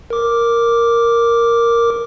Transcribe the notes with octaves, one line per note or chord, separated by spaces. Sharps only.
A#4 D6